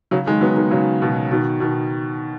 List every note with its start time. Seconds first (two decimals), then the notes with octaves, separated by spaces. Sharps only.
0.11 C#3 F#3
0.26 D#3 G#3
0.41 F#3 B3
0.57 D#3 G#3
0.71 C#3 F#3
1.02 B2 D#3
1.31 B2 D#3
1.60 B2 D#3